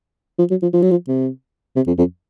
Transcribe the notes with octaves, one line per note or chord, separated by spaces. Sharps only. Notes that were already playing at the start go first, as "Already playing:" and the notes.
F3
F#3
F3
F3
F#3
F3
C3
C3
F2
F2